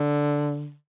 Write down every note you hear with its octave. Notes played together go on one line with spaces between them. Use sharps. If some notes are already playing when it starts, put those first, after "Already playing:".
Already playing: D3